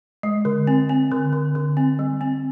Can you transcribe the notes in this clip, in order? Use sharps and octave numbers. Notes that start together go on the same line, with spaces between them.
G#3
D3
C4
C4
D3
D3
D3
C4
G3
C4